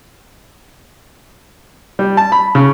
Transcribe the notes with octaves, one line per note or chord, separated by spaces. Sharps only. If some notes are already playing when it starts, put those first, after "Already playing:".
G3
A5
B5
C#3